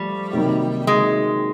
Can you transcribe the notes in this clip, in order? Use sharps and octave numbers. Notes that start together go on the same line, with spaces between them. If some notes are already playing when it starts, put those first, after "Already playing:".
Already playing: F3 G3 A3
C3 D#3 F#3 A#3 D#4
G#3